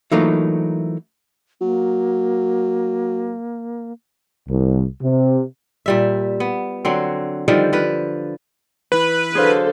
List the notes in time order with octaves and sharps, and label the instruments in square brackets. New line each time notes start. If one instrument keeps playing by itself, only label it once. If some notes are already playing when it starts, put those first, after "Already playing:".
[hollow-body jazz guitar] E3 F#3 A3 A#3 D#4 F4
[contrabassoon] F#3 [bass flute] A#3
[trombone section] C2
C3
[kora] A#2 G3 E5
B3
D3 F#3 C4
D3 D#3 F3 G3
F3 B4
[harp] E3 E4 [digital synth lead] B4
[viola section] D3 F#3 A4 [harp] G#4 C5 F5